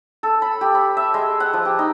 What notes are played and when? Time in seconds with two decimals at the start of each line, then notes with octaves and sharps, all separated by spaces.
0.23 A4
0.42 B5
0.61 G4
0.75 B5
0.97 E5
1.14 G#3
1.40 F#5
1.53 F3
1.65 G4
1.79 D#4